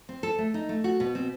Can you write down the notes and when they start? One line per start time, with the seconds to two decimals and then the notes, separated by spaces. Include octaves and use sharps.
0.09 C4
0.23 A4
0.38 A3
0.54 D#4
0.69 A3
0.84 F#4
1.00 B2
1.15 C4